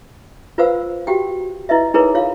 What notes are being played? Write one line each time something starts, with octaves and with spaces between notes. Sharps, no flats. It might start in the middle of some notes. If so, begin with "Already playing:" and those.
F4 B4 C5 F5 F#5 E6
F#4 G4 F#5 G5
E4 B4 D#5 E5
D#4 E4 G#4 A#4 B4 C#5
F4 C#5 F5